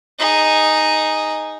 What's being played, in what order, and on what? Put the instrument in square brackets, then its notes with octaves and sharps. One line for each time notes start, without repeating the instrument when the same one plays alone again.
[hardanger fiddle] D#4 G#4